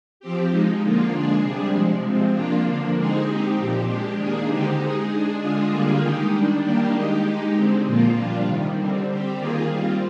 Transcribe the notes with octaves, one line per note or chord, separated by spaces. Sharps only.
F3 C4 G4
F3 G#3 D#4
D3 F3 A#3 F4
G#3 D4 G#4
C3 G3 D4 G#4
C3 F3 G#3
C3 F3 G#3 C4
F3 A#3 D4 F4
D3 F3 A#3 D4
D3 G#3 C4 D#4 G#4
G#3 C4 D#4 G4
A#2 F3 C4 G4
G#3 D4 G4
D#3 A#3 D4 G#4
D3 G#3 C4 D#4 G4
G#3 D#4 G#4
G#3 D4 G#4
D3 G#3 D4 F4 G#4
D3 G3 A#3 F4 G#4
D#3 G#3 D#4 G4
D#3 G3 D4
D#3 G3 A#3 D4 G4
G#3 D#4 G4
G#3 D#4 G4
D3 G#3 C4
A#2 F3 A#3 F4
G3 D4 F4
C3 D#3 G3
D3 G3 C4
G3 C4 G4
D#3 A#3 F4 G#4
G3 C4 F4